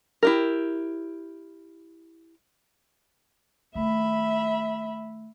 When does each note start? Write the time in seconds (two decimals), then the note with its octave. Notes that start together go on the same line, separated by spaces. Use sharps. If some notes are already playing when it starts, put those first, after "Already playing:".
0.23 E4 G4 A#4
3.75 D#3 A3 E5 B5